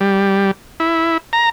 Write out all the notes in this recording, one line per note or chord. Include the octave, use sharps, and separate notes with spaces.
G3
E4
A#5